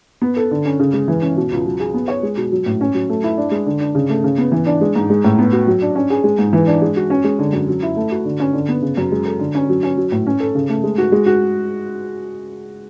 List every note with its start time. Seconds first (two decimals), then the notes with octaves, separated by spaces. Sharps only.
0.22 B3
0.37 A4
0.51 D3
0.65 C#4
0.80 C#3
0.93 G#3
1.08 E3
1.22 C#4
1.37 B2
1.51 C#2
1.65 F#3
1.80 G#4
1.94 B3
2.08 C#5
2.23 G#3
2.37 B2
2.52 F#3
2.66 A2
2.81 C#4
2.94 F#3
3.09 A3
3.24 E4
3.37 D4
3.51 G#3
3.66 D3
3.80 D4
3.95 C#3
4.09 A3
4.24 C#3
4.38 B3
4.52 E3
4.66 D4
4.81 G#3
4.96 G#2
5.10 G#3
5.24 A2
5.39 B3
5.53 F#4
5.67 F#3
5.82 D4
5.95 C#4
6.10 G#4
6.24 G#3
6.39 G#2
6.53 E3
6.67 D4
6.82 G#3
6.96 F#4
7.10 C#4
7.24 G#3
7.39 D3
7.53 F#2
7.68 F#3
7.83 E4
7.96 A3
8.11 F#4
8.25 D3
8.40 C#4
8.53 D3
8.69 B3
8.82 C#3
8.97 F#2
9.12 G#3
9.25 A4
9.40 D3
9.55 C#4
9.69 F#3
9.83 C#4
9.97 F#3
10.12 A2
10.27 C#4
10.40 A4
10.55 C#3
10.69 A3
10.83 G#3
10.98 F#4
11.12 G#3
11.26 F#4